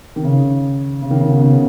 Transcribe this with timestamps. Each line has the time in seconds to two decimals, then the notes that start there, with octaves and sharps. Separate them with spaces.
0.16 D#3
0.24 C#3
1.02 C#3
1.11 D#3
1.21 C#3
1.30 B2
1.40 C#3